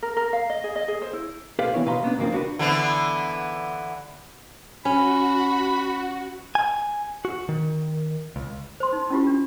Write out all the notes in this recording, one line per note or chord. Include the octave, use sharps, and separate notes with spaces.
A#4
A#4
F5
D#5
G#4
D#5
G#4
C5
E4
G4 A4 B4 C5 D5 F5
E3 B3 E4 C#5
B2 B4 F5 A#5 C6
A#3 B3 C#4 D4
G#2 C#3 F3 A#3 C4
D4 F#4 B4
D3 E3 B3
C#4 F#4 B5
G#5
F#4
D#3
C#2
C5 C6
D#4
C#4 E4 F4 G4
D4